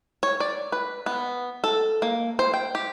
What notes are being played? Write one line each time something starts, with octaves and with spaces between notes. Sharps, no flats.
C#5
D5
B4
B3
A4
A#3
C5
G5
G4